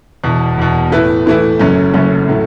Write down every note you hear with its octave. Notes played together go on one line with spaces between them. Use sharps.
E1 E2 B2
E1 E2 B2
A2 E3 A3 E4 B4
A2 E3 A3 E4 B4
F#1 F#2 F#3 A3 C#4
F#1 F#2 F#3 A3 C#4
A2 F#3 A3